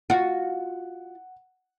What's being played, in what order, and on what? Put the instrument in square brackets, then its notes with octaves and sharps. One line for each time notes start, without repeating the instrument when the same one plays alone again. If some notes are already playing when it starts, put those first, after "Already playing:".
[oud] F4 F#4 [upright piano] F#5